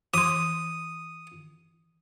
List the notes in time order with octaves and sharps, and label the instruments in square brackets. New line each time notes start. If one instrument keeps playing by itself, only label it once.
[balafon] E3 C6 [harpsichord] D#6